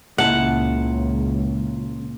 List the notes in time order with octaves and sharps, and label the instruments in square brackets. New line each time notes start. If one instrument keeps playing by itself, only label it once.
[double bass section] C#2 [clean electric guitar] A#2 A5 [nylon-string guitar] C#3 C#4 E4 [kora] F#5